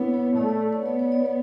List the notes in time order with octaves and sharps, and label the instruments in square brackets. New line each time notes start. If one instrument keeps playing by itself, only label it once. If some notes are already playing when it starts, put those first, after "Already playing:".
Already playing: [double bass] B3 [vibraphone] D4 E4 C#5
[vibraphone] C#5
[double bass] A3 [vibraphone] D5
[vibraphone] D5
C#5
[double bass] B3 [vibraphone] D5
[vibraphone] C#5
D5
C#5